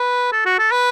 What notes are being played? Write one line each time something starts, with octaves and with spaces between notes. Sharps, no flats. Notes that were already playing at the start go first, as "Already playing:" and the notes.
Already playing: B4
A4
F#4
A4
B4